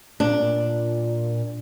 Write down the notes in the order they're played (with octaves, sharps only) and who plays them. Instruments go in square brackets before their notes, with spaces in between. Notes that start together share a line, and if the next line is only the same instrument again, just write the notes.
[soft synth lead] A#2 [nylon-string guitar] D4